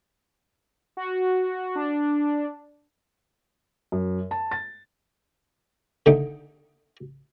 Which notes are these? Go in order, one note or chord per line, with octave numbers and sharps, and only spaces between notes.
F#4
D4
F#2
A5
A6
D3 A3 D#4 G5